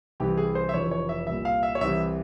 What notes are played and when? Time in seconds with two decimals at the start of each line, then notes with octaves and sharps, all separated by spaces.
0.20 C2 C3 E3 G4
0.37 G#4
0.55 C5
0.69 E5
0.74 F1 F2 C#3 E3 C#5
0.91 C#5
1.09 E5
1.27 C2 A#2 E5
1.45 F5
1.63 E5
1.75 C#5
1.81 C2 C3 E3 E5